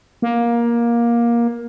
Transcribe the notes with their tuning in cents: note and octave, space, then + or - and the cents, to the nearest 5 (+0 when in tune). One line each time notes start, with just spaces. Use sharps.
A#3 +15